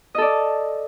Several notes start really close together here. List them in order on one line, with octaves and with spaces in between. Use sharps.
D#5 A4 D5